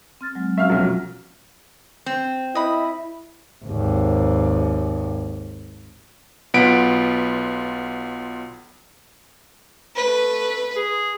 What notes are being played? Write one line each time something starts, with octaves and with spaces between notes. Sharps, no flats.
C4 F6 A6
F#3 G#3
C#4 F#4 E5 F5 F6
B1 F3 F#3 F4
C4
E4 D#5 B5
G#1 D#2
B1 B3 F4 F#5 B6 D7
A3 B4
G#4